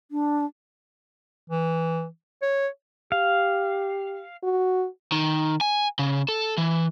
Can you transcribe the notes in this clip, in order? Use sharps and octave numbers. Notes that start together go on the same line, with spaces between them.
D4
E3
C#5
G4 F5
F#4
D#3
G#5
C#3
A4
E3